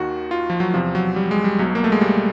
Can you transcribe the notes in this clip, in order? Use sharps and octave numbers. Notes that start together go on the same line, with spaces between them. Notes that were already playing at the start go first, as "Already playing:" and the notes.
Already playing: D#2 D#3 F#4
F4
F3
F#3
E2 C3 F3
F#3
G3
G#3
G3
B1 B2 F#3
A#3
A3
G#3
G3